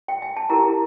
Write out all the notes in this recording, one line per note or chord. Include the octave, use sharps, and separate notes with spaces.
G5
G#5
A5
E4 G4 A#4 A#5